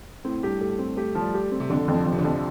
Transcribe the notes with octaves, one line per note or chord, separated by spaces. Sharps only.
A2 C4
G2 G4
A3 G4
C4
A3 G4
F3
G3
G4
C4
C3
F2 D3
F2
F3
F2
C3
D3
F2